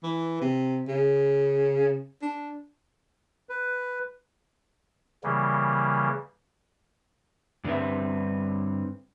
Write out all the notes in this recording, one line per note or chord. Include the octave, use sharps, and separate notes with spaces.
E3
C3
C#3
D4
B4
C#3 E3 G3 A#3
G2 D3 G3 C4 B4 E5